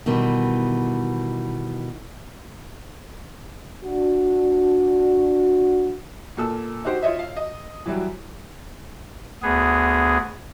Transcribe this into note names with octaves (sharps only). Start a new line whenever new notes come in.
B2 D#3 E3 G3
D4 F#4
A#2 A4 E6
D#4 F#4 G4 C5
F4 C#5 D#5 E5
F5
D#5
E3 F#3 G3
D2 B3 G#4